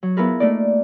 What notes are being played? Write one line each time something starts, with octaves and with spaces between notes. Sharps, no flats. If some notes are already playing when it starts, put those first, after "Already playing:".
F#3
B3 E4 F4 G#4 A#4 B4
A3 A#3 D#4 D5